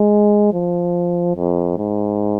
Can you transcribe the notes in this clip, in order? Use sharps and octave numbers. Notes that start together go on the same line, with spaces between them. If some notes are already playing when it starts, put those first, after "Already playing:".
Already playing: G#3
F3
F2
G#2